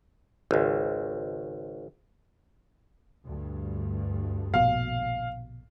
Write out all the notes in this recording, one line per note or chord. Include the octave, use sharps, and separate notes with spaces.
G#1 C#2
D2 G2
A#1 B2 F5